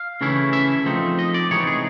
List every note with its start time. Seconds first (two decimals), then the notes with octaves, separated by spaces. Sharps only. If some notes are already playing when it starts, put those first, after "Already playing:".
Already playing: F5
0.21 C#3 E3 A3 C#4 E4
0.53 E5
0.85 F3 A3 C4 D#4
1.19 D#5
1.34 D5
1.51 C3 E3 G#3 B3 D#4 C#5
1.67 G#4